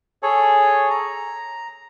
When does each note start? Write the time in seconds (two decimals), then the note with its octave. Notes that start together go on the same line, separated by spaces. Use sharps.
0.23 G#4 A4 C#5
0.90 A#5